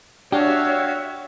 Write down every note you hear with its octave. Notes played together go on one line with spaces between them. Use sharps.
D4 F#4 G4 C#5 E5 F5